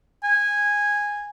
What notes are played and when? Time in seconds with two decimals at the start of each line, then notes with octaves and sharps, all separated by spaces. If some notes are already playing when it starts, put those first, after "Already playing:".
0.24 G#5